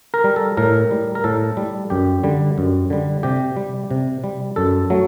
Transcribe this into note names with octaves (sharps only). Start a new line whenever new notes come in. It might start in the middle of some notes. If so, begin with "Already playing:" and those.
A#4
G3
A4
A2 A#4
G3
A#4
A2 A4
G3
F#2 G4
D3 G3
F#2
D3 G3
C3 G4
G3
C3
G3
F#2 A4
F#3 A3